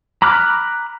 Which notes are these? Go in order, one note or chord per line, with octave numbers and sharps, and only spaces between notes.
A#5 B5 D6 F6 F#6